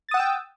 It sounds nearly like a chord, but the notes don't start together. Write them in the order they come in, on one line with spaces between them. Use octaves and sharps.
A6 D#6 F#5 E6 G5